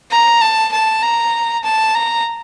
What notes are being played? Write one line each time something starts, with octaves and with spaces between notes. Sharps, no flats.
A#5
A5
A5
A#5
A5
A#5